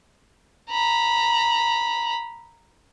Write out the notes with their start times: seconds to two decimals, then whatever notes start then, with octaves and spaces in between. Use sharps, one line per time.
0.71 A#5 B5